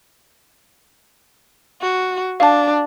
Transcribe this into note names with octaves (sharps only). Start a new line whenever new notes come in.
F#4
D4 F5 A5